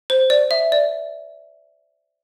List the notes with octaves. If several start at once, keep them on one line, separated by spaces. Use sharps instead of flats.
C5
D5
E5
D5